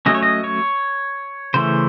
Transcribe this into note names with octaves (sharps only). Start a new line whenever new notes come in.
F#3 A3 C#4 D#5
C#5
D#5
C#5
C#3 E3 A3 C#4 C5